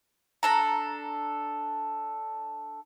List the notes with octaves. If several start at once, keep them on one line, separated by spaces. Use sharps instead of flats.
D4 A4 A#5